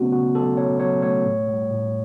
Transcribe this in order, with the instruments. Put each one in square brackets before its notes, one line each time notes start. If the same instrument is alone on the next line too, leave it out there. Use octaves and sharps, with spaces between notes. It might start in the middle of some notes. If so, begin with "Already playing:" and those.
Already playing: [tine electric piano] C#3 F#3 A3 B3 C#4 F#4
C#3 F#4
F#3 A4
F#3 C#5
F#3 C#5
A3 C#5
A2
G3
A2